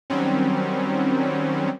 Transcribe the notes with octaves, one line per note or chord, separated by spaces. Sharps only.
D#3 F#3 G3 C4 C#4